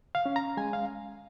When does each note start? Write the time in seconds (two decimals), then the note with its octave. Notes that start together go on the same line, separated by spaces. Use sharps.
0.15 F5
0.26 C#4
0.36 A#5
0.57 G#3 G#5
0.73 F5